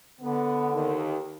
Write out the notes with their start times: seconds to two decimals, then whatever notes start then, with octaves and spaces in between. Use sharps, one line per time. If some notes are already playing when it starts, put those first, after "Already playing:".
0.21 D3 B3
0.73 D#2 D#3